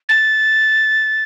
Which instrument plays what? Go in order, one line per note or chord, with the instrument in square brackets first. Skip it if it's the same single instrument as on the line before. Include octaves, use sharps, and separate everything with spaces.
[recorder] A6